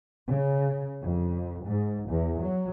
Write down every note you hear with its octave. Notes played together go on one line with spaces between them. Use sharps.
C#3
F2
G#2
E2
F#3